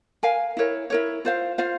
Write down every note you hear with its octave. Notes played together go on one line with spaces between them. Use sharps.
A#4 F5 G#5
E4 A#4 C#5
E4 A#4 C#5
F4 C5 F5
F4 C5 F5